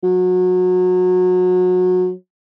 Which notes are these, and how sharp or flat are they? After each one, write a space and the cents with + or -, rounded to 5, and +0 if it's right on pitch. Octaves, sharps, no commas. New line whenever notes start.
F#3 -25